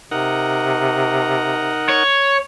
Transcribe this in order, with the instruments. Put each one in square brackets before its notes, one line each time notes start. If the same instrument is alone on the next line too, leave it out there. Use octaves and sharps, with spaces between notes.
[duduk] C3 [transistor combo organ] D#4 A#4 F#5
[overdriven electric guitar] C#5